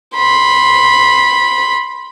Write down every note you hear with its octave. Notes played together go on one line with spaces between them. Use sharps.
B5 C6